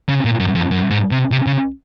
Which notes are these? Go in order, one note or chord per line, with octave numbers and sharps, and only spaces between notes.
C#3
A#2
F#2
F2
F#2
G#2
C3
C3
C#3